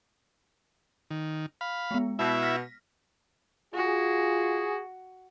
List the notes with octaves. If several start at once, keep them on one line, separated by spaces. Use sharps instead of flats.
D#3
F5 B5
G#3 B3
B2 E4 E5
F6 A#6 B6
F4 F#4 G#4